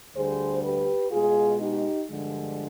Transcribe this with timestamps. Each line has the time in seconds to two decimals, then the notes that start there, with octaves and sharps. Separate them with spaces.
0.14 D2 D3 G3 G#4 C5
0.63 G4 B4
1.11 B2 G#3 F4 G#4
1.60 D#4 G4
2.08 G2 D3 F3 G#3